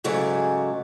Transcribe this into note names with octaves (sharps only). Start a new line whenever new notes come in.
G#2 C#3 F#3 A3 D5 G#5